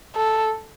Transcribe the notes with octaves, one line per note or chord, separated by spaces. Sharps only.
A4